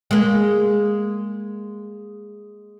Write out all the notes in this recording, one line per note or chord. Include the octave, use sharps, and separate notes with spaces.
G#3 A#3